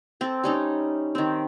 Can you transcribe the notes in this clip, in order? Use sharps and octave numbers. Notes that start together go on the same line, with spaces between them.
C4 A4
G3 C#4 D#4
D#3 C4